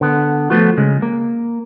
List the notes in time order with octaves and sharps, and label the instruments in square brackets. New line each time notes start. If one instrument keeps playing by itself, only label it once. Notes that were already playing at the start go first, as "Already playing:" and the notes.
[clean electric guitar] D3 B3
F3 A3 B3 F4 F#4
C#3 G#3
A#3